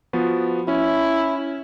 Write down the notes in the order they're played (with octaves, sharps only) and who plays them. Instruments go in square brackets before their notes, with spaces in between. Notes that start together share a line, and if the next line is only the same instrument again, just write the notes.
[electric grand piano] F3 B3 F#4
[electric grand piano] C#4 [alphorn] E4